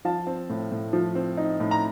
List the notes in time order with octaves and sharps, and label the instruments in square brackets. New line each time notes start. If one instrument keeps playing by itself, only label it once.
[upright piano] F3 F5 A5
C4
A2
A2
F3
C4
D#4
A2
A#5